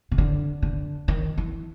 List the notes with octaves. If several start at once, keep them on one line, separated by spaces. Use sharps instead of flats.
C#3
D3
D3
D#3
E3